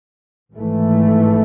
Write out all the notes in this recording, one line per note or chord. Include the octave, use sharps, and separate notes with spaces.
G#1 G#2 E3 A3